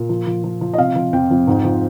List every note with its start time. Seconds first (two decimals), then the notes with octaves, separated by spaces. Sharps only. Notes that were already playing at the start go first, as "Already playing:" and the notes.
Already playing: A#2
0.09 F3
0.26 F3
0.44 F3
0.61 F3
0.74 D#5
0.78 C3 F5
0.96 F3
1.13 F2 G5
1.30 F2
1.47 G#2
1.64 F3